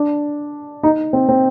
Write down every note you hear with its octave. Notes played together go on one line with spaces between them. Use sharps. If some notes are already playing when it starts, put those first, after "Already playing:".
Already playing: D4
D#4
C4
C4